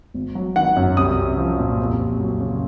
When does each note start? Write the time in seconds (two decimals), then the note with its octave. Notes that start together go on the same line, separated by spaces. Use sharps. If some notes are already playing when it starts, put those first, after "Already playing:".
0.14 G#1
0.35 F#3
0.56 D#3 F#5
0.76 F#2
0.97 C2 D#6
1.17 C2
1.38 F3
1.58 A#2
1.79 F2
2.00 F2
2.20 F#3
2.40 C#3